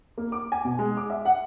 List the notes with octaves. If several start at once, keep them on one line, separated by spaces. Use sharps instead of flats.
A#3
D6
G#5
B2
G#3
D6
E5
F#5